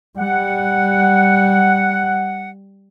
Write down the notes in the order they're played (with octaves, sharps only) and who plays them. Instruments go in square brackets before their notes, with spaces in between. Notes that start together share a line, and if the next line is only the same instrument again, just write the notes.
[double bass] G3 [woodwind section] F#5